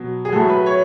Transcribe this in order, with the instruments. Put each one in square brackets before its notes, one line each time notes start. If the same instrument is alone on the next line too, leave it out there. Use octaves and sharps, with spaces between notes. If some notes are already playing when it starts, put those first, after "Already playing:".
Already playing: [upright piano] B2 F#3
G#4
A2 F#3 A4
B4
C#5